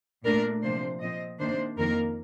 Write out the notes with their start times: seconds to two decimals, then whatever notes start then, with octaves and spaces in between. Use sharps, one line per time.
0.25 A#2 A3 D4 A#4
0.63 C3 F3 A#3 D4 C5
1.02 A#2 F3 C4 D#5
1.40 C3 D#3 A#3 D4 C5
1.78 F2 D#3 A#3 A#4